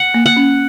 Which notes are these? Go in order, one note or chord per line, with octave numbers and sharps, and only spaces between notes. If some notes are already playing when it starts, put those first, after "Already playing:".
Already playing: F#5
A#3
F#5
C#4